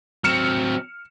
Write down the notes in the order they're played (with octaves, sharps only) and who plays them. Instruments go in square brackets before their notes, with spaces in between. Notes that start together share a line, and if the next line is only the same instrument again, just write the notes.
[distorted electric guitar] F#3 C4 [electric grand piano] F6 C#7 E7